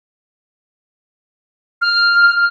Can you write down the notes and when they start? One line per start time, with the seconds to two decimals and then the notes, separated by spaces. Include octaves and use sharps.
1.81 F6